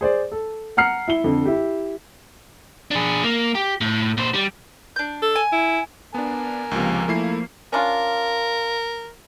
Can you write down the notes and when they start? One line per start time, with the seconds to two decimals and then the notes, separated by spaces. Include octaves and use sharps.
0.01 G#4 C5 D5
0.32 A4
0.77 F#5 A#5 F6 C7 C#7
1.08 E4 G7
1.24 F2 D3
1.45 E4 G4
2.91 D4 G#4
3.24 A#3
3.55 G4
3.81 A2
4.17 A#2 C5
4.34 G3
4.96 D4 G6
5.22 A4
5.36 G#5
5.52 E4
6.14 B3 D4 A#4 G#5
6.71 C#2 C3 F3 A#3
7.08 A3 E4 C7
7.73 C#4 D4 F4 A#4